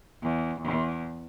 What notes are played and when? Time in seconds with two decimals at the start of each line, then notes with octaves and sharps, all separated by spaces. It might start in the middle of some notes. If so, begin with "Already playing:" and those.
0.23 E2
0.61 E2